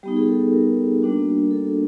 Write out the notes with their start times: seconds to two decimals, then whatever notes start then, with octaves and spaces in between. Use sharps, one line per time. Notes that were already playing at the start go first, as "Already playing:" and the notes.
0.03 G3 B3 D#4 G4
0.16 G#4
0.28 A4
0.53 A#4
1.02 G3 A#3 D4 F#4
1.51 A4